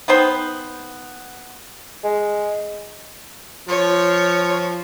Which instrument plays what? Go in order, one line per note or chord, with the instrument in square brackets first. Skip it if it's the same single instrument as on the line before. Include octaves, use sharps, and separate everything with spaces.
[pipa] B3 D#4 C5 G5
[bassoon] G#3
[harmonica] F3 [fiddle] C#5